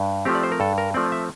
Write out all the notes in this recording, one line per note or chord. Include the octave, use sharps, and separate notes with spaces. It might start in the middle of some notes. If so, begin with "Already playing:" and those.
Already playing: G2
F3 A3 C4 G4
D5
C5
A#4
G2 A4
A#4
F3 A3 C4 D5
E5